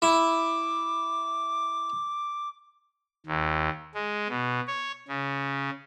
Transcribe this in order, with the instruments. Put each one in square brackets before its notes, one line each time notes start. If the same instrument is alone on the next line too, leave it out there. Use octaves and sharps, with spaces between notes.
[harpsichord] E4 [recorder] D6
[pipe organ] D#2
G#3
B2
C#5
C#3